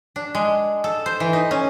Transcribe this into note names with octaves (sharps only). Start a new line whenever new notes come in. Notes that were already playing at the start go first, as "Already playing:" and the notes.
D4
G#3
A4
C5
E3
D#4
C#4